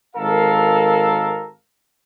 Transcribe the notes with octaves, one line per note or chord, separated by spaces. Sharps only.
G#1 A4 A#4 F5